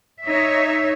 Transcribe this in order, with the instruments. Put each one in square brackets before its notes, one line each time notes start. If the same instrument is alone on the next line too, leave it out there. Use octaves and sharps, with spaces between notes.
[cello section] D#4 C#5 E5